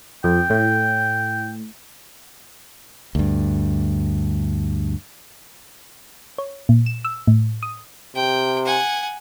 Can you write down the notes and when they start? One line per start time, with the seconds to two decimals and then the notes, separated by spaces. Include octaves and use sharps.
0.24 F2 G5
0.50 A2
3.15 D2 G2
6.38 C#5
6.69 A#2
6.86 E7
7.05 E6
7.27 A2
7.63 D#6
8.15 C3 G5
8.65 F#5 G#5